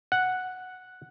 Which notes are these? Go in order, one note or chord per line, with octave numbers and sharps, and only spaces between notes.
F#5